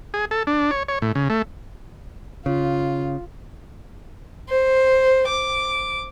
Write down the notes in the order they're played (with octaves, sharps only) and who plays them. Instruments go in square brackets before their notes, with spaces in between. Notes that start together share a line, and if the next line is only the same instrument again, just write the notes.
[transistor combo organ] G#4
A4
D4
C#5
C#5
A2
C#3
A3
[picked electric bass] C#3 [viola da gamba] F4
[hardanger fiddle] C5
D6